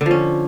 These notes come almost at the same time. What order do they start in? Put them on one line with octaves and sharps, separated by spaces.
D3 F3 C#4